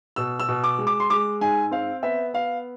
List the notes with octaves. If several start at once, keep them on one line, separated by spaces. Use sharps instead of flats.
B2 E6
E6
B2
D6
G#3
D6
C6
G#3 D6
G#2 G#5
C4 F5
B3 E5
B3 F5